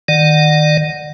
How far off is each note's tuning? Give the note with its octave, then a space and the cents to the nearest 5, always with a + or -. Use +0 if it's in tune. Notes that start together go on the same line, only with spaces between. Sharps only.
D#3 +0 D5 +30 F#5 +0